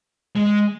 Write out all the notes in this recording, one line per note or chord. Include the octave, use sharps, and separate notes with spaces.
G#3